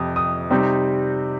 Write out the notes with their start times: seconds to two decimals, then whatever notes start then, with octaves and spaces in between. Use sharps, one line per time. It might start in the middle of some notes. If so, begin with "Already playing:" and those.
Already playing: F2 C3 D#6
0.16 D#6
0.50 C3 G3 C4 D#4